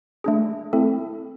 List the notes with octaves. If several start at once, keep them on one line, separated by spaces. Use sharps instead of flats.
A3 D4 G#4
A3 C4 E4 A4